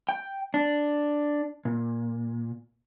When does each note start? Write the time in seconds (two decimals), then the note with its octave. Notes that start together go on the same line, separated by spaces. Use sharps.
0.09 G5
0.54 D4
1.65 A#2